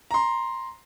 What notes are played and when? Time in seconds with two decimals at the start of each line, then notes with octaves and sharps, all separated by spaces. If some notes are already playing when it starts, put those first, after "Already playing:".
0.11 A#5 C6